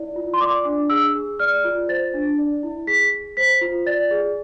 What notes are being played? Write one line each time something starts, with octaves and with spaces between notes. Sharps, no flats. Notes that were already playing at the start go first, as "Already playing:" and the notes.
Already playing: E4 D5
F4
C6
D5 D6
D4
G#4 E6
G#4
D5 F6
F4
C5 A6
D4
D5
E4
G#4 B6
G#4
C5 B6
F4
D5 A6
G#4